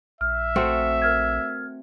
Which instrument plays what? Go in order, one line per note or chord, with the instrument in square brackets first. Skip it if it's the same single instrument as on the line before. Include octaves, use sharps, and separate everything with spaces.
[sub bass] A#1 [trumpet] E5 [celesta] F6
[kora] A3 C4 F#4
[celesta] A#4 F6 G#6